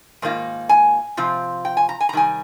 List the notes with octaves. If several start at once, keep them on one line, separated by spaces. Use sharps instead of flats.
G#2 D#3 A#3 F4
G#5
C3 F3 C4 F4
G5
G#5
A#5
G#5
A#5
C3 D#3 G3 G#5